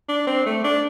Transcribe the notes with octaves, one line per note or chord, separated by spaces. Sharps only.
D4
C4
A3
D4